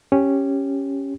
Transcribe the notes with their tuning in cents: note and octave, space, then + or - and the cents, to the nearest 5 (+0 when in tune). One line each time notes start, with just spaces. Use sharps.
C#4 -5 G4 +0